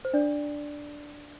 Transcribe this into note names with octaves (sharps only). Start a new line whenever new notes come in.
C5
D4 D5